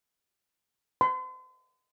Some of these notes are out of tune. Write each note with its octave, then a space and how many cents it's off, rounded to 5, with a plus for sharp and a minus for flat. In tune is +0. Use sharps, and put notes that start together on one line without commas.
C6 -40